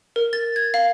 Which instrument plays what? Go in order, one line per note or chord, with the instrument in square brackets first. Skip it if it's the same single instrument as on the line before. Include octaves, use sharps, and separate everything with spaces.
[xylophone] A#4
A6
G#6
F5